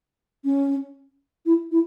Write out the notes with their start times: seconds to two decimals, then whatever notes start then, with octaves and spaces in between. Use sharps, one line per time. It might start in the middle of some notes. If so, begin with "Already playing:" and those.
0.45 C#4
1.46 E4
1.72 E4